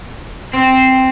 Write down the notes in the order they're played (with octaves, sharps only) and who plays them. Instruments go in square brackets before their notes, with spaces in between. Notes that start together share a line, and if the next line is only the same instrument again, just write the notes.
[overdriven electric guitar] C4